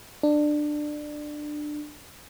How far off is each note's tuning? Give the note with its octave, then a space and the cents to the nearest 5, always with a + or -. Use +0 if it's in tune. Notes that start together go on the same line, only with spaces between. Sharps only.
D4 +20